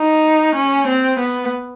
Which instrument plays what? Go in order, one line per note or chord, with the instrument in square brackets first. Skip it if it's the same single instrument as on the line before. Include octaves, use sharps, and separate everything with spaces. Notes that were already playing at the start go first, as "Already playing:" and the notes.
Already playing: [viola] D#4
C#4
C4
B3